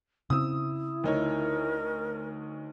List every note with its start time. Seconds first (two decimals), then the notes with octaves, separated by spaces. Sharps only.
0.30 C#3 C4 E4 D#6 E6
1.04 D2 D#4 A#4 C#5